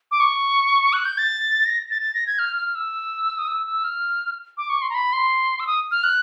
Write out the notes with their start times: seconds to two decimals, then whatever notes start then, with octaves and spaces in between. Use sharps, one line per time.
0.11 D6
0.20 C#6
0.93 F#6
1.05 G6
1.18 A6
1.66 A#6
1.91 A6
2.02 A6
2.14 A#6
2.27 G#6
2.39 F6
2.57 F6
2.75 E6
3.39 D#6
3.48 E6
3.67 E6
3.84 F6
4.57 D6
4.70 C#6
4.82 C6
4.90 A#5
4.94 B5
5.13 C6
5.60 E6
5.67 D#6
5.91 F6
6.04 F#6